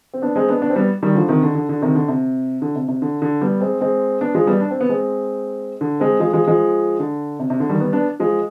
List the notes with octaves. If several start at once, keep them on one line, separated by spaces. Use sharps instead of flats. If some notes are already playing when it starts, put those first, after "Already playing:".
C4
B3 D4
G#3 C4
B3 D4
B3 D4
C4
G3 B3
D#3 G3
D3 F3
C3 D#3
D3
D3
D3
C3 D#3
D3
C3
D3
C3
C3
D3
D3
G3 B3
G#3 C4
G#3 C4
B3 D4
F3 G#3
G3 B3
D4
C4
B3
G#3 C4
D3
G#3 C4
F3 G#3
F3 G#3
F3 G#3
D3
C3
C3
D3
D#3 G3
G3 B3
B3 D4
F3 G#3